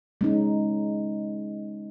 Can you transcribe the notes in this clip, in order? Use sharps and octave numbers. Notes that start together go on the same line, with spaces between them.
G#3 C#4 D#4